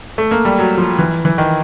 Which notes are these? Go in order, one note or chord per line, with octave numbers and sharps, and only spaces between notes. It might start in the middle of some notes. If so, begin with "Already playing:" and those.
A3
A#3
G3
F#3
F3
E3
E3
D#3